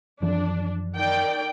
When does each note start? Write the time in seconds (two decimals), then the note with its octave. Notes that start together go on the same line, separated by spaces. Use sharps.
0.22 F#2 E3 F3 D4
0.95 D#3 D5 G5